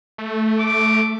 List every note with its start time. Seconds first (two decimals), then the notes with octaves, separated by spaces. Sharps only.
0.18 A3
0.60 D6